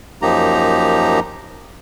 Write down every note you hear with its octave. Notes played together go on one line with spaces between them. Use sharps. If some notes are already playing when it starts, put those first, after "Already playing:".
F#2 F3 A#3 D#4 G4 A#5